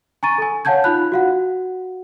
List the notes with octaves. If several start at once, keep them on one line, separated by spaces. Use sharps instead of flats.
G#5 A#5 C#6 A6 D#7
A4 G#5
C#5 F5 F#5 A5 G6 G#6
D#4 F4 B5 F#6
F#4 F5 F#5